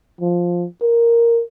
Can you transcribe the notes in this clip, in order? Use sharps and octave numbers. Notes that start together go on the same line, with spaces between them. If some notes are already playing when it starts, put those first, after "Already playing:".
F3
A#4